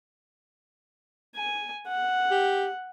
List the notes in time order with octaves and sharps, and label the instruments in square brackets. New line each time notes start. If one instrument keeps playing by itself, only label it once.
[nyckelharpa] G#5
F#5
[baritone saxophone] G4